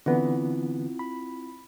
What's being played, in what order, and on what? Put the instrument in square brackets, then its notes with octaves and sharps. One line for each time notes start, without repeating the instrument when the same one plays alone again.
[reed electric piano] D3 E3 B3 [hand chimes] C4 E4 F4
[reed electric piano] B5